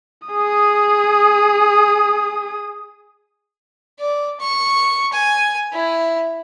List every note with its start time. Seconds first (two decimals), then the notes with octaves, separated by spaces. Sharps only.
0.28 G#4 D#6
3.99 D5
4.40 C#6
5.12 G#5
5.73 E4